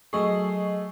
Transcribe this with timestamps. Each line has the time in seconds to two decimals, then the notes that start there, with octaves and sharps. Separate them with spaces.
0.13 F#3 A3 G#4 D#5 C#6 C7